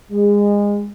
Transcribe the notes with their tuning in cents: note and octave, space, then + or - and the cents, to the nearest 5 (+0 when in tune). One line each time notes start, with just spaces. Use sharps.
G#3 -25